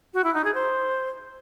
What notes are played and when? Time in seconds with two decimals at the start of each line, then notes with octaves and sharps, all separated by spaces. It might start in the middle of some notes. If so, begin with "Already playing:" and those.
0.14 F#4
0.24 E4
0.34 D#4
0.44 G#4
0.55 C5